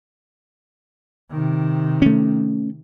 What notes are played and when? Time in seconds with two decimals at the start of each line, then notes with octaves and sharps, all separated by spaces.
1.30 C3 D#3
2.02 A3 C#4